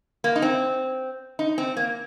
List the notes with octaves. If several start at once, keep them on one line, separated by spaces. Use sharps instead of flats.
A#3
D#4
C4
D#4
C4
A#3